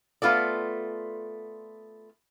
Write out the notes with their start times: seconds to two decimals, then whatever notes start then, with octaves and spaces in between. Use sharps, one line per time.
0.22 A3 B3 F4 A4 D5